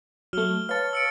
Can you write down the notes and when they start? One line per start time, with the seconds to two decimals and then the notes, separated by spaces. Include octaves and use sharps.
0.33 F#3 A3 F6 G7
0.69 B4 C#5 F5 A5 C#6 F6 A6
0.93 E6 C#7 D7